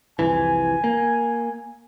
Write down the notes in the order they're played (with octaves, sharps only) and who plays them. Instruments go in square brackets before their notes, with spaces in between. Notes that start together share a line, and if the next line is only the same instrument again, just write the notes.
[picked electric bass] C2 F2 E3 [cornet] G#5
[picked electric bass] A#3